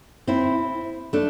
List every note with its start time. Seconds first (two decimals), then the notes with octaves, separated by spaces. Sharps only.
0.27 C4 E4
1.13 A3 D4